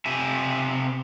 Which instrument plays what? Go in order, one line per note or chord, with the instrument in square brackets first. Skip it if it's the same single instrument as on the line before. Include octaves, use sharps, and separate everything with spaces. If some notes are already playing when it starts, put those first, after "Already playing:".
[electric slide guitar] C3 G4 E5 G#5